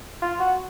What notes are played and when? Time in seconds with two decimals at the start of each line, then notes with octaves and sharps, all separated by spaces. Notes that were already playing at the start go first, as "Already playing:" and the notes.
0.22 F4
0.39 F#4